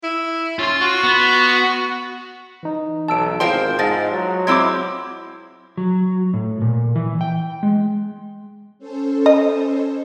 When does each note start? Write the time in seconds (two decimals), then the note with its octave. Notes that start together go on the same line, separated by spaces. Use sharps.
0.04 E4
0.59 C#4 F4 C6
0.81 F#4
1.03 B3
2.63 E3 D#4
3.08 B1 A5 E6 D7
3.40 G#1 E4 F4 G#4 A#4 C5 G5 C6
3.79 G#2 G#3 A5 A6 A#6
4.12 F#3
4.47 G#3 C4 E4 D6 E6 G#6
5.78 F#3
6.34 A2
6.62 A#2
6.96 E3
7.21 G5
7.63 G#3
8.79 C#4 A4 C5
9.26 D#5